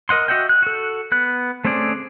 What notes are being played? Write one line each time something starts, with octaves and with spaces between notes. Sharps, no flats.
A#4 D#5 F#5 C6
F#4 D#5 E5 F#5 G5
F#6
F#4 A4
B3 F#6
A3 C4 C#4 G#4 D5